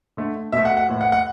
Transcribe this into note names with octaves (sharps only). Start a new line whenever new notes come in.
D3 A3
B2 A3 E5
F#5
F#5
A2 E3 A3
F#5
F#5